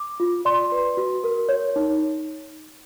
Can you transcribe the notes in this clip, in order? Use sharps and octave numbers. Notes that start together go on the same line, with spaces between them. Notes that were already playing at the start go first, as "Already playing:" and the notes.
Already playing: D6
F4
D5 C6
B4
F#4
A#4
C#5
D#4